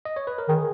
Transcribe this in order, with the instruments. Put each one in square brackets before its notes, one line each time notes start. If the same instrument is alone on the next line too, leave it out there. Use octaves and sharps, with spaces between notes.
[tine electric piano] D#5
C#5
B4
A#4
[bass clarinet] D#3 [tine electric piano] G#4